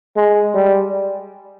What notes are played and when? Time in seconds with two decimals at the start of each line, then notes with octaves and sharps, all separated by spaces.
0.16 G#3
0.54 G3